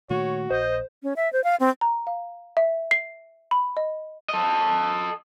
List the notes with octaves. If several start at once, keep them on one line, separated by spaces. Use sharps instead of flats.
A#2 D#3 A3 F#4 C#5
A#1 C5 D#5
C#4
E5
C5
F5
C4
A#5
F5
E5
C7
B5
D#5
A4 D#5